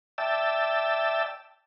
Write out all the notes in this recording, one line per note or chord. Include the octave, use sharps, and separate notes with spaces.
D5 E5 G5 A5 E6